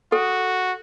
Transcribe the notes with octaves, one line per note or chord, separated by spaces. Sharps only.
F#4 A4